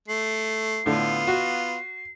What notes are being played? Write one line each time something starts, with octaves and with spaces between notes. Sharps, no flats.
A3 C7
A2 D3 B3 F4
F#4